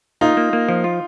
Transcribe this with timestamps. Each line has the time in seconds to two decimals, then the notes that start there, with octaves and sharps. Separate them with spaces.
0.21 A#3 D#4 F4
0.37 A#3
0.53 A#3
0.69 F3
0.84 F4